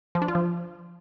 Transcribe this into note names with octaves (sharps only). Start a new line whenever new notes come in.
F3
D4
F4
F3